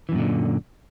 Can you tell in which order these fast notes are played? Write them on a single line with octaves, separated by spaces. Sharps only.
E3 F#2 A#2 D3